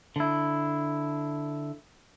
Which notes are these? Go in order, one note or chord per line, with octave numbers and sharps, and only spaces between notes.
D3 E4